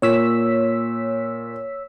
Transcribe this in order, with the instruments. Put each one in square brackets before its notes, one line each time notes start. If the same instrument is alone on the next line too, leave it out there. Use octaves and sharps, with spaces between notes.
[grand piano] A#2 [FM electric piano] C#5 E6 B6